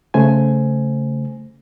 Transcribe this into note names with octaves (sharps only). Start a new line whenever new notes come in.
C#3 A3 C5 G#5